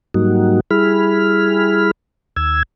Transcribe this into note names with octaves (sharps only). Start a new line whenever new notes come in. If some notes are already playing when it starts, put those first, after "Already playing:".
G#2 F#3 G3 A#3 D#4 F#4
G3 E4 G#4 B5 F6
D#2 E6 G#6